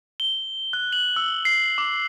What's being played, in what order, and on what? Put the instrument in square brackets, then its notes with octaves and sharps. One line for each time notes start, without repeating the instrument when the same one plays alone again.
[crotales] G7
F#6
F#7
E6
C7
D6